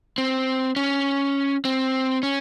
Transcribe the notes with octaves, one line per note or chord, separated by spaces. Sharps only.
C4
C#4
C4
C#4